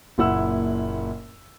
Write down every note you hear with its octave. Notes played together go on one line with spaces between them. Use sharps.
F#1 A#2 E4 F#5 E6